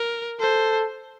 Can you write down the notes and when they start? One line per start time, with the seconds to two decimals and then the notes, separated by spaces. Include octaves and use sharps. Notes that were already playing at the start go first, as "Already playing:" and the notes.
Already playing: A#4
0.40 A4 C5